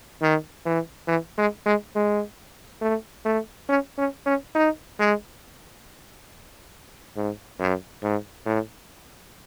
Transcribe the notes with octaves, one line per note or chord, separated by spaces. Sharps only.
D#3
E3
E3
G#3
G#3
G#3
A3
A3
C#4
C#4
C#4
D#4
G#3
G#2
F#2
G#2
A2